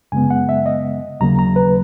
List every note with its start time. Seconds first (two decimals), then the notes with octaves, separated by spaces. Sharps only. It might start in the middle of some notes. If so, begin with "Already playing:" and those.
0.12 F#2 C#3 G#3 B3 G#5
0.30 F#5
0.49 E5
0.66 D#5
1.20 D#2 C#3 F#3 A#3 A#5
1.39 A#5
1.56 B4